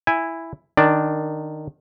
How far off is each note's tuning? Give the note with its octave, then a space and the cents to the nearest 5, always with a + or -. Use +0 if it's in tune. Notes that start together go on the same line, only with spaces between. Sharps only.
E4 +5 G#5 -15
D#3 -15 D4 +0 D5 +0